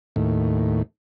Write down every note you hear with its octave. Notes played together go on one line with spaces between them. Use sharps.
D#2 A2